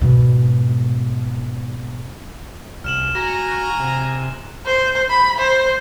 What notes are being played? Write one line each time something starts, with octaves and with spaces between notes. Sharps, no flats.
G#2 B2
C2 F6 E7 F#7
F#4 G#5 A#5 A#6
F#6
C3
C5
B5
C5